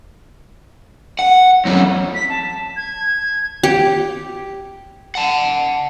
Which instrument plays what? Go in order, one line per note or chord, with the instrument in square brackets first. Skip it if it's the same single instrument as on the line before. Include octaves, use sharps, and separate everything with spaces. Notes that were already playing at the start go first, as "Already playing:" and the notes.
[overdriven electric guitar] F#5
F#2 C4
[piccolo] B6
A5
G#6
[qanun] G4
[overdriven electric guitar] F#5 A5